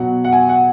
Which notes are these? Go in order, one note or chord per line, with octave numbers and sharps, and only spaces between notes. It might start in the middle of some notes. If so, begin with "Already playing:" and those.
Already playing: B2 F#3 F#5
F#5
G#5
F#5